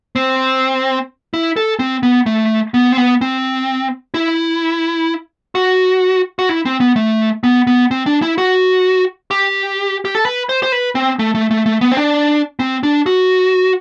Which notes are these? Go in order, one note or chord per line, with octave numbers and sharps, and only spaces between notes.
C4
E4
A4
C4
B3
A3
B3
C4
B3
C4
E4
F#4
F#4
E4
C4
B3
A3
B3
B3
C4
D4
E4
F#4
G4
G4
A4
B4
C5
C5
B4
C4
A3
A3
A3
A3
B3
C4
D4
C4
D4
F#4